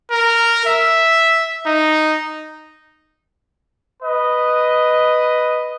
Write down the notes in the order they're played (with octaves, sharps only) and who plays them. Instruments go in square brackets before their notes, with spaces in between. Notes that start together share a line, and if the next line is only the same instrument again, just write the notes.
[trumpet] A#4
E5
D#4
[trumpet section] B4 D#5